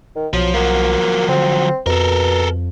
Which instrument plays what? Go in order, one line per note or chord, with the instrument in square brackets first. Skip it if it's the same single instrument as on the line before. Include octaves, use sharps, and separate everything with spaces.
[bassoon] D#3
[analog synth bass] B1 [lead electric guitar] F3 [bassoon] F#3
[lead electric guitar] F3 F#3 [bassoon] A#3
[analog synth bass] D3 [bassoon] C4
[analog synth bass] F2 [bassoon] B2 [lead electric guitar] A4 A#4